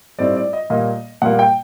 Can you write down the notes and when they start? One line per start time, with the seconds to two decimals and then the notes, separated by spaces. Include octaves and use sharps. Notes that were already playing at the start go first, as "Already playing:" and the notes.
0.19 A2 G3 C4 D#4 D5
0.36 D5
0.53 D#5
0.70 A#2 G3 A#3 D#5
1.22 A#2 G3 A#3 F#5
1.39 G5